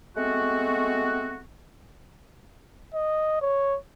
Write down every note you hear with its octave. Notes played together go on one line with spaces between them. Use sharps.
G#3 A3 B3 C4 F#4
D#5
C#5